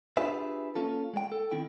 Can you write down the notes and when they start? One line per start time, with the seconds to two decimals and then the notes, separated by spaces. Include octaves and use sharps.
0.17 D4 F4 G4 G#4 B4 E5
0.75 A#3 C#4 F4 A4
1.14 G#3 G5
1.32 A4
1.51 D#3 C4 E4 G5